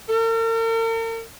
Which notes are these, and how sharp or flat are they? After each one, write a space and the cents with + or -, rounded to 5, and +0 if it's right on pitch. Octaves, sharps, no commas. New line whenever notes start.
A#4 -45